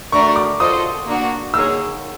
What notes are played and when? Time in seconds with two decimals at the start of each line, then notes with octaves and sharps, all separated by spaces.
0.12 A3 D4 F#4 A#4 D5 C#6
0.36 D6
0.60 F4 A4 C5 D#5 D#6
1.07 A#3 D4 F#4
1.53 A#3 D#4 G#4 C#5 E6